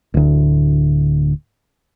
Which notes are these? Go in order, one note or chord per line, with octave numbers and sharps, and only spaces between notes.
D1 D2